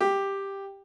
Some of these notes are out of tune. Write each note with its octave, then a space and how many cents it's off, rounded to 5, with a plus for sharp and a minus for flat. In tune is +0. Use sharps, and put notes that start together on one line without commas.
G4 +5